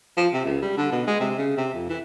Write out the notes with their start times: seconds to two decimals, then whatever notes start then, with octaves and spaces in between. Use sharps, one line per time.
0.17 F3
0.34 C3
0.45 C#2
0.62 G3
0.77 D3
0.92 B2
1.07 G#3
1.20 C3
1.39 C#3
1.57 C3
1.74 F2
1.89 E3